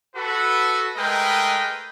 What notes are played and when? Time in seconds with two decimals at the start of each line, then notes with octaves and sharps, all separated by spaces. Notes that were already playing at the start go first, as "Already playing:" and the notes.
0.16 F#4 A4 B4
0.96 G#3 A3 A#4 B4 D#5 G5